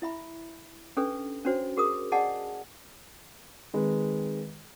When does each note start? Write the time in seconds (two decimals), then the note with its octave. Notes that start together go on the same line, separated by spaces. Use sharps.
0.02 E4 E5 B5
0.97 C#4 D4 G4 A4 B4
1.45 C#4 D4 F#4 C5 C#5
1.77 F#4 G#4 A#4 D#6
2.12 G#4 D5 D#5 F#5 G#5 A5
3.74 D#3 G#3 C4 B4